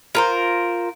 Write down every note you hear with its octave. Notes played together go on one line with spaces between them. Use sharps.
F4 A#4 C5